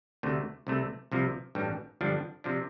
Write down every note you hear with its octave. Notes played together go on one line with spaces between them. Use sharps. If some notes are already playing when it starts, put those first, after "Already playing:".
D2 C3 A3
C2 C3 A3
C2 C3 F3
A1 G2 G3
G1 G2 F3 D4
C3 F3 D4